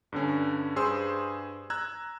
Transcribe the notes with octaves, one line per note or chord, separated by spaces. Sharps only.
G2 D3 C#4
G2 G#4 C5 C6 E6
A#5 E6 F#6 G#6